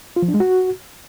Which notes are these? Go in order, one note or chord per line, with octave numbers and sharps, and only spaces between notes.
F4
F3
D4
G#3
F#4